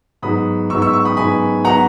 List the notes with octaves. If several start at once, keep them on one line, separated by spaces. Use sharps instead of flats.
G#2 F#3 B3 B5 D#6
G#2 F#3 B3 C#6 E6
C#6 E6
C#6 E6
B5 D#6
G#2 F#3 B3 G#5 B5
F#3 B3 F#5 A#5